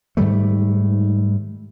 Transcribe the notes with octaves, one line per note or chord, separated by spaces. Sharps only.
G#2 D#3 G3 A3